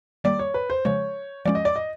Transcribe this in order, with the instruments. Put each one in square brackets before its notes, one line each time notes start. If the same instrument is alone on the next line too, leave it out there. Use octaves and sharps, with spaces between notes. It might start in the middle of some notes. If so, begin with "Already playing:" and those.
[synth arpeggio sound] D#3 G3 A#3 [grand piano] D5
[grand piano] C#5
B4
C5
[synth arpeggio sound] C#3 F3 G#3 [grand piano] C#5
[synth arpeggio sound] F3 G#3 C#4 [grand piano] D5
[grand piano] D#5
D5
D#5